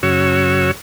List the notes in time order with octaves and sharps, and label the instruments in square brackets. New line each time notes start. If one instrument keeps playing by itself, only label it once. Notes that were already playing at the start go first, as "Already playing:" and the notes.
[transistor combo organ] F#2 C#3 F#4 C#5 E6